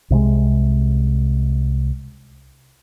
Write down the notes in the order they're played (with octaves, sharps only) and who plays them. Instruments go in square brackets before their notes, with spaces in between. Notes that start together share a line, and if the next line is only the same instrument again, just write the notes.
[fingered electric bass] C2 C3 F#3 G#3